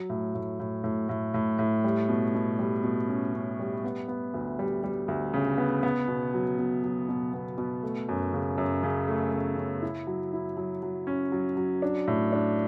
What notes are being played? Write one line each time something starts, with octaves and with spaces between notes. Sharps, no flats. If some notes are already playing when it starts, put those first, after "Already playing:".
Already playing: F#3
A2
A2
A2
A2
A2
A2
A2
G3
B2
B2
G3
B2
C#4
C#4
G3
B3
B3
D2
G3
G3
D2
C#3
B3
B3
B2
F#3
B2
F#3
B2
B3
B2
A3
F#2
C#3
F#2
C#3
A3
C#3
C#3
E4
F#3
E4
F#3
F#3
C#4
F#3
F#3
D4
A2
D4